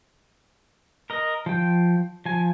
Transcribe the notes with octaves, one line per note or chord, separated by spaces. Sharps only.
A#4 D#5
F3 G5
F3 G#5